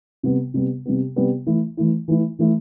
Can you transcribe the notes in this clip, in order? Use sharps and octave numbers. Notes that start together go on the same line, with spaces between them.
C3 G3 B3
C3 G3 B3
C3 G3 B3
C3 G3 B3
E3 A3 E4
E3 A3 E4
E3 A3 E4
E3 A3 E4